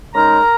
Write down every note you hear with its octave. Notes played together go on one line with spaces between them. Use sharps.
C#3 G#3 D#4 A#4 A#5